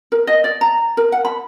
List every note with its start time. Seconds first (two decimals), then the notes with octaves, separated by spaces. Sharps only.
0.12 A#4
0.27 D#5
0.44 D5
0.61 A#5
0.97 A#4
1.12 F#5
1.25 B5